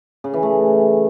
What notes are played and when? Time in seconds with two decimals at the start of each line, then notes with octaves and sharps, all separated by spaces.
0.24 C#3
0.33 E3
0.43 A3